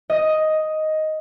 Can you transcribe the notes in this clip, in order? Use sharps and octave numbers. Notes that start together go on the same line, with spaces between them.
D#5